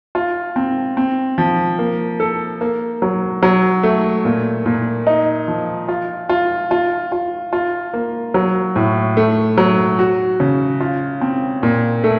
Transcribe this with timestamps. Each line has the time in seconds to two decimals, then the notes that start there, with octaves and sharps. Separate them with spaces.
0.15 F4
0.56 C4
0.97 C4
1.38 F3
1.79 A#3
2.20 A4
2.61 A#3
3.02 F#3
3.43 F#3
3.83 A3
4.25 A#2
4.66 A#2
5.07 D#4
5.48 F3
5.88 F4
6.29 F4
6.71 F4
7.12 F4
7.53 F4
7.93 A#3
8.34 F#3
8.76 A2
9.17 A3
9.58 F#3
9.99 F#4
10.40 C#3
10.80 F4
11.21 C4
11.63 A#2
12.04 A3